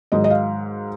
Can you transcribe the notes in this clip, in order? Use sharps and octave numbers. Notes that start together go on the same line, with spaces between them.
G#2 D#3 F#3 D#5
D#5
F5